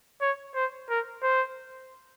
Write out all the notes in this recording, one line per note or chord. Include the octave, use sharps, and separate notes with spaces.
C#5
C5
A#4
C5